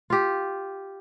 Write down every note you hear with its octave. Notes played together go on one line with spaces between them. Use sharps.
F4 G4